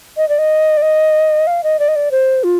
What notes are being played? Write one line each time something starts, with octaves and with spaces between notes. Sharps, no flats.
D#5
D5
D#5
D5
D#5
F5
D#5
D5
D#5
D5
C5
F4